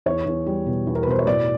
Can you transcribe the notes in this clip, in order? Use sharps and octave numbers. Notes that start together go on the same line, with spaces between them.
E2 C#5
E2
G3
B2
E2
A#4
B4
B2 C5
C#5
A2 D5